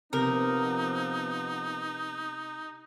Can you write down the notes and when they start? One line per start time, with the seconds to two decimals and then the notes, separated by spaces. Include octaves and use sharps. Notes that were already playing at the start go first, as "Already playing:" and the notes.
0.13 C3 F3 B3 D#4 A#4